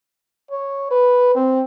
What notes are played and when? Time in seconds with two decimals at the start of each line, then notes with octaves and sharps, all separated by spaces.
0.51 C#5
0.91 B4
1.36 C4